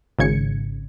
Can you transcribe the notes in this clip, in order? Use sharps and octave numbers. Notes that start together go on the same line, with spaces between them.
G#1 C#3 G#6 C#7